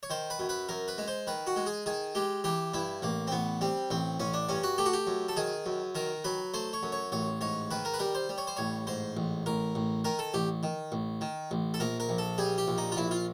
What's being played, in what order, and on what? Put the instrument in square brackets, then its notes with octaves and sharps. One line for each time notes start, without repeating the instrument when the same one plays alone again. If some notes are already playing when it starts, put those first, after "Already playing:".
[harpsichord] C#5
D#3 C5
B4
F#2
B4
F#2 A#4
B4
G#3
C5
D#3 B4
F#4
G#3
G#4
D#3 G#4
G#3 G4
E3 G4
G2 E4
A1 A#3
C4
A1 B3
G3 C4
A1 C4
A1 C#4
D4
G2 C#4
F#4
A3 G4
F#4
G4
F#2
A4
D#3 G#4
F#2
D#3 A#4
F#3 B4
A3 C5
C#5
F#2
C#5
A1 C#5
G#2 C#5
D#3 B4
A#4
B4
G3 A#4
C5
G3
C#5
C5
A1 C#5
G#2 C5
A1
A1 A#4
A1
D#3 A#4
A4
A1 G4
D#3
A1
D#3
A1
A4
A#1 A#4
A#4
A#1
A4
G3 G#4
G4
A#1
D#4
F4
A#1 E4
F4